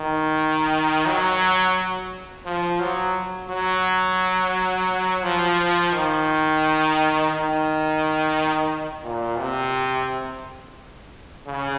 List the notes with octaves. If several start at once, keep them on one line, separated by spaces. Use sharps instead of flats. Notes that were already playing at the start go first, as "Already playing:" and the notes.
Already playing: D#3
F#3
F3
F#3
F#3
F3
D#3
D#3
A#2
C3
C#3